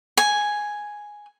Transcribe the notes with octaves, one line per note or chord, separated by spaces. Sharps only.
G#5